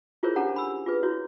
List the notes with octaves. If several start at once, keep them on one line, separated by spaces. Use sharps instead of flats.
E4 F4 G#4 A#4 C5 C#5
C#4 D4 G4 A4 F#5 A#5
D4 B5 E6
F4 G#4 B4
E4 F#4 C#5